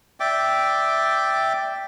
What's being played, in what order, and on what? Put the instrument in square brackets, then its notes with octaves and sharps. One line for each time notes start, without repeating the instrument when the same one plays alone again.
[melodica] D5 E5 G5 D6